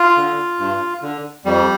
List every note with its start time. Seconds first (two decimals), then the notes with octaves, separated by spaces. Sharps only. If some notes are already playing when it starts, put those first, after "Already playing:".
Already playing: F4
0.17 D3
0.59 G2
1.02 D3
1.45 F2 G3